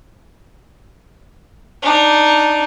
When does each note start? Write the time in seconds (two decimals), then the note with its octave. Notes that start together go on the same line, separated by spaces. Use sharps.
1.82 D4 D#4